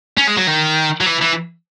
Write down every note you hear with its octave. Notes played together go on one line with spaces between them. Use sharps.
C#4
G#3
F#3
D#3
F#3
E3
E3